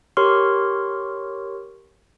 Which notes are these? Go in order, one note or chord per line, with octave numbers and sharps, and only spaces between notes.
G4 A#4 C#5 C6 C#6 F6